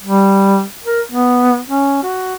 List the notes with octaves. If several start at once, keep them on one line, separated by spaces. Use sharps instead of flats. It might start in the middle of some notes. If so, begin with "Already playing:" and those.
G3
A#4
B3
C#4
F#4